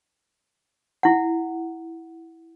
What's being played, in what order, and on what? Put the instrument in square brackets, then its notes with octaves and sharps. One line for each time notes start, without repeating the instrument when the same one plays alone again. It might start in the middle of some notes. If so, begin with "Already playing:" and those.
[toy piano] E4 F#5